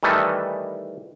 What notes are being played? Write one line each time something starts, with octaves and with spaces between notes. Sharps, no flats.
D#3 E3 G3 A3 A4 B4